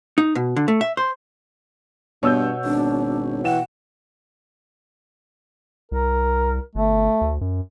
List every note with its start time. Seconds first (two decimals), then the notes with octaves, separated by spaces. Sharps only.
0.18 D#4
0.35 B2
0.56 D3
0.68 A3
0.81 E5
0.97 C5
2.23 G2 B2 C#5 E6 G6
2.65 G#1 D4
3.44 E3 F#5 G5 E7
5.92 C2 A#4
6.75 G1 A3
7.21 D2
7.41 F#2